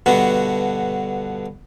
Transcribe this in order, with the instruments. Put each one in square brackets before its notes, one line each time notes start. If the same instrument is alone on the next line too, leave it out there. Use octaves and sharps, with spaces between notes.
[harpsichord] G2 B2 D3 B3 F#4